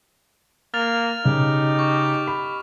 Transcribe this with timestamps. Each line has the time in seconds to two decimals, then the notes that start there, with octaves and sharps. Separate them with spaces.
0.74 A#3 F6 A6 F7
1.25 C#3 D#4 G4
1.79 C#6
2.27 B5